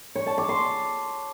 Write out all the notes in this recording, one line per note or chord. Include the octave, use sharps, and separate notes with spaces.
C#5
A5
D6
C6